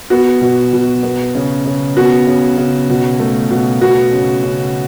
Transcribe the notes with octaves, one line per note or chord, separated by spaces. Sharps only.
B3 F#4
B2
B2
B3
C#3
C#3
B3 F#4
C#3
C#3
B2
A3
B2
B3 F#4
C#3
C#3